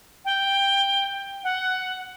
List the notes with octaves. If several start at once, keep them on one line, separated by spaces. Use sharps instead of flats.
G5
F#5